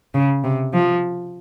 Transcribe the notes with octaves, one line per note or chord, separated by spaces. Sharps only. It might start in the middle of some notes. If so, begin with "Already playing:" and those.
C#3
C3
F3